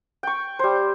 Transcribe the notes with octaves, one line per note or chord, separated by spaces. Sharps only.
G5 C#6
G3 C5